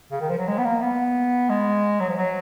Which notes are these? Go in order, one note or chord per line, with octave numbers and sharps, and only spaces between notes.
C#3
D#3
F3
F#3
G#3
B3
A#3
B3
G#3
F#3
F3
F#3